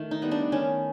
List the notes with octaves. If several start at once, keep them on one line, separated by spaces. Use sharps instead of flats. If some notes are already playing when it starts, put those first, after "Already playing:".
Already playing: D#3 A3
D#4
G3 B3
D4
D#3 C#4